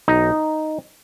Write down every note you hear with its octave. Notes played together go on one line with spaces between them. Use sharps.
B1 D#4